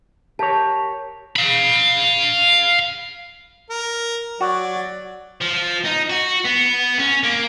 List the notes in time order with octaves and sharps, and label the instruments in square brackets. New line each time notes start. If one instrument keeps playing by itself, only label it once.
[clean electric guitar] G4 A#4 C#5 [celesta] A5
[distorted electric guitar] F5 B5
[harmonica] A#4
[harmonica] F#3 D5 [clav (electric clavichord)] F#4
[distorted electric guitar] F3
D#4
F#4
B3
C#4
A#3